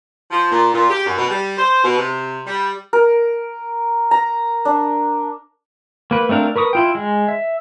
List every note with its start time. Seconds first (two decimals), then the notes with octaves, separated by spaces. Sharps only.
0.31 F3
0.52 A#2
0.74 A#2
0.90 G4
1.06 F#2
1.18 B2
1.30 G3
1.58 C5
1.84 B2
1.98 C3
2.47 G3
2.93 A#4
4.11 A#5
4.65 D4
6.11 A#3 B4
6.29 A3 C4 D4 A#4 F5
6.56 A#4 B4 C#6 D#6
6.73 E4 F4 G5
6.95 G#3
7.28 E5